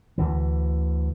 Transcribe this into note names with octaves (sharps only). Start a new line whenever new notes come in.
D2 D3 E3